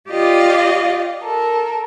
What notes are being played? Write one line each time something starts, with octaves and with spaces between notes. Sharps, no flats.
F4 G4 D5 D#5 F5
A4 A#4